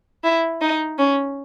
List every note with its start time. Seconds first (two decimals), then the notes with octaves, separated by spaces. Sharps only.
0.24 E4
0.61 D#4
0.99 C#4